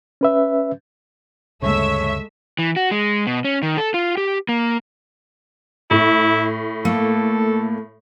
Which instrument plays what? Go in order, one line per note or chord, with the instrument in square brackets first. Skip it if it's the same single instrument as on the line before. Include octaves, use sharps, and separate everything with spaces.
[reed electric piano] C#4 B4 E5
[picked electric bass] D2 G2 C#3 [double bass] G#3 A3 [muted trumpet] C#5 [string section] E5
[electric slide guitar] E3
F#4
G#3
B2
C#4
D#3
A4
F4
G4
A#3
[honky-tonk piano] A2 [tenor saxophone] E4
[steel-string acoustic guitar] A3 A#3 [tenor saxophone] A4